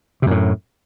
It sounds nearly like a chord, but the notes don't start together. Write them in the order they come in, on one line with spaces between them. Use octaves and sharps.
C3 F#2 A2